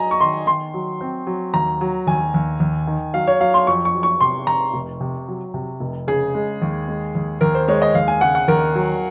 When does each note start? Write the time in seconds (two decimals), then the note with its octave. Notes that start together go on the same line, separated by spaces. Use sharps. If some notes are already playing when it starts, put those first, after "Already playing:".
Already playing: F#3 D#5 G#5 A#5
0.11 C#6
0.20 D#3 C6
0.47 D#3 C6
0.74 F#3
1.01 C4
1.27 F#3
1.54 D#2 A#5
1.81 F#3
2.07 D#2 G#5
2.34 D#2
2.60 D#2
2.87 D#3
3.14 F#3 F5
3.27 C#5
3.40 F#3 F5
3.54 C6
3.67 F2 C#6
3.85 C#6
3.94 F#3
4.03 C#6
4.20 C3 C6
4.47 C3 A#5
4.74 F1
5.01 C3
5.28 F#3
5.54 C3
5.80 F1
6.07 C#3 G#4
6.35 G#3
6.62 D#2
6.88 G#3
7.15 D#2
7.41 D#2 A#4
7.55 C5
7.68 G#3 C#5
7.82 D#5
7.95 D#2 F5
8.08 G#5
8.21 C#3 F#5
8.35 F#5
8.48 D#2 A#4
8.75 F#3